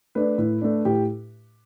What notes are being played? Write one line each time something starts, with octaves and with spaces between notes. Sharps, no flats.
A3 D4 B4
A2
A3 D4
A2 G4